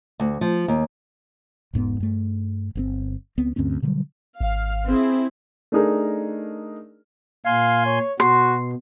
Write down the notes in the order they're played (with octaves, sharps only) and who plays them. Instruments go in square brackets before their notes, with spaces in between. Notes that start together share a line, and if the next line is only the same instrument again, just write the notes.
[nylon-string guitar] D2
F3
D#2
[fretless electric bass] E1 G#2 A#3 B3
G2 A3
G1 C3 C4
C#2 B3 C4
D2 G2 C4 C#4
B2 D3 F#3 G3
[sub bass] G#1 [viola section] F5
[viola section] C4 E4 G#4
[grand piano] A3 D4 D#4 G#4 A#4
[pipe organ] A#2 G#5 C6 [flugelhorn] F5
[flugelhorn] C#5
[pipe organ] B2 [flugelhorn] F#4 [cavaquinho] C6